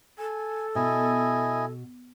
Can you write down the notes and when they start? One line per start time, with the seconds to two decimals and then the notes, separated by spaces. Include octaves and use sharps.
0.18 A4 G#5
0.75 B2 E4 D#5 G#5